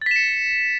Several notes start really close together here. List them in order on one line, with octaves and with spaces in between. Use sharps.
A6 B6 E7 C#7